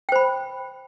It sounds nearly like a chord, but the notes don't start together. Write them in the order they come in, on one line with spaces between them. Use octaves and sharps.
G5 C5 B5